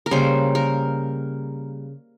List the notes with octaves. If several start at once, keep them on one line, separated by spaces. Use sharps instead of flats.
A#4
C#3 G3 A#3 C5
A#4